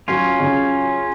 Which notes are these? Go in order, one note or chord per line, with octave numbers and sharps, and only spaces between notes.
F#3 C#4 F4
C#3